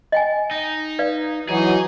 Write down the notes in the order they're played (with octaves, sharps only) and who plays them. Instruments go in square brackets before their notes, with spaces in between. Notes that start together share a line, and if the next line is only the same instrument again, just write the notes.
[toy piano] D#5 G5 G#5
[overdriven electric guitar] D#4
[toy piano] B4 D5 F5
[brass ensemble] E3 F#3 D#4 [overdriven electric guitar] G#4